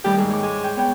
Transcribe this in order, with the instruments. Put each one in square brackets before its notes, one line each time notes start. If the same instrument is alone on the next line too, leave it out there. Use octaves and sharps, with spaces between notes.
[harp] D#2 A2 G3 [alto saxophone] G4
[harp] G#2 [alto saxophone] G#4
[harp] C#5 D6
[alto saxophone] G#3
[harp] G5
B3 C#5 G5